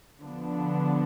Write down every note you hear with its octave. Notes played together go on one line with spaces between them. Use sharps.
D3 F3 B3 D4